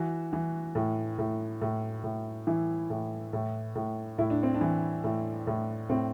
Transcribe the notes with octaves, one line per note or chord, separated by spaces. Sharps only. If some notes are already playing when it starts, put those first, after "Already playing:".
Already playing: E3 F#4
E3
A2
A2
A2
A2
E3 E4
A2
A2
A2
A2 E4
D4
C4
D4
E3
A2
A2
A2 C4